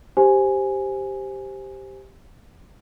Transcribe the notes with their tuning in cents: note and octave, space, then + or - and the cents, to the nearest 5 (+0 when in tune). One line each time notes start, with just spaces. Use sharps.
G4 +0 C5 +0 G#5 +0